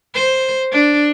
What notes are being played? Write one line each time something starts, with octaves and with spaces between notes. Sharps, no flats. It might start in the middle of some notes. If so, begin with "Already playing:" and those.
C5
D4